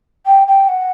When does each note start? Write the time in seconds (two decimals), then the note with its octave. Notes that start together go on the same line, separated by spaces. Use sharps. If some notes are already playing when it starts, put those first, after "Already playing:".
0.26 G5
0.47 G5
0.68 F#5